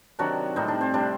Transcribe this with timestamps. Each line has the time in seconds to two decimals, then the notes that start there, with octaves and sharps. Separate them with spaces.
0.19 C3 D#3 F#3 D4 F#4
0.56 A2 G3 C4 D#4
0.68 D4
0.81 C4
0.94 C3 G3 D4